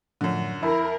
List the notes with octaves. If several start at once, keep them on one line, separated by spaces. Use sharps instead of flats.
F#2 A2 D3 F3
F2 E4 A#4 E5